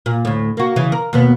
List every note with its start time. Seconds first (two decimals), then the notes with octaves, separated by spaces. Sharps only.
0.06 A#2
0.25 D2 A2
0.57 A#3 F#4
0.76 C#3 E3
0.92 A#4
1.13 D#2 B2 B3